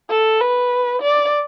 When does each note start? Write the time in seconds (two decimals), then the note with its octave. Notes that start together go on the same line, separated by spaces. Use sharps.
0.10 A4
0.41 B4
1.02 D5